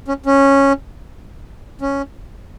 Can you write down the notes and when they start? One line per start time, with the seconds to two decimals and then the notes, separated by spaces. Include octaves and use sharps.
0.08 C#4
0.26 C#4
1.81 C#4